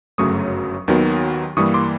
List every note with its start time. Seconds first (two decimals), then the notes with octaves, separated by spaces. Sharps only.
0.18 G1 F#2 C#3 F#3 A3 C#6 D#6
0.88 D#2 D#3 F#3 B3
1.57 G2 E3 G3 A#3 C#6 D#6
1.74 C6 D6